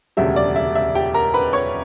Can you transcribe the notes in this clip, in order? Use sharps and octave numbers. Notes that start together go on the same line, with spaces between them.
E1 D2 C#3 G3 E5
D5
E5
E5
G4 G5
A#4 A#5
B4 B5
C#5 C#6